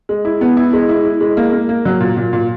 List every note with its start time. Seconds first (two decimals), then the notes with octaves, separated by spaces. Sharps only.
0.09 G#3
0.25 E4
0.41 B3
0.57 E4
0.73 G#3
0.89 E4
1.05 E4
1.21 G#3
1.37 A#3
1.53 A#3
1.69 A#3
1.85 F#3
2.00 A#2
2.17 A#2
2.33 A#2